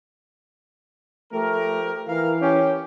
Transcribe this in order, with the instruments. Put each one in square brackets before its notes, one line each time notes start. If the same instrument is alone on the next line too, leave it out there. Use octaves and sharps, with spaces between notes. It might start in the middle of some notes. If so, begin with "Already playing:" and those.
[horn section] F3 G4 A#4 [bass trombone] A3
[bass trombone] E3 [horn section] A#4 F5
[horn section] C#4 G4